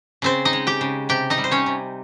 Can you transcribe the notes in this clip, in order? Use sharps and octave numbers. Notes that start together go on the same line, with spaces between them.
C#3 C4 C5
D#4 D#5
G#3
G4 G5
C#3
C3 G4 G5
D#4 D#5
G3
C5
C#4 C#5
C3